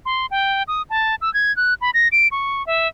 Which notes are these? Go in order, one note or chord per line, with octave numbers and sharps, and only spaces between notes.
C6
G5
D#6
A5
E6
G#6
F#6
B5
A#6
D7
C#6
E5